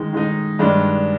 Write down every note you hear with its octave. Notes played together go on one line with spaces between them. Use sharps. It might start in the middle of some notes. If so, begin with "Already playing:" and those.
Already playing: D#3 G#3 D#4
D#3 G#3 D#4
G2 D#3 G#3 D4